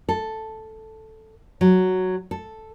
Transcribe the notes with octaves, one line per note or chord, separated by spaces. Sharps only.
A4
F#3
A4